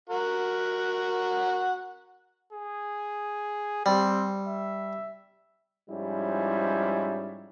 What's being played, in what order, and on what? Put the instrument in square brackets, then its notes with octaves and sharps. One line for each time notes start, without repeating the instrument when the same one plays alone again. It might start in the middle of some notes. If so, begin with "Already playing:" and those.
[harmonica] F#4 A#4 F#5
[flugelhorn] G#4
[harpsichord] G3 [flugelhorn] C4
[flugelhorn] E5
[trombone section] G#2 F3 G3 C#4 E4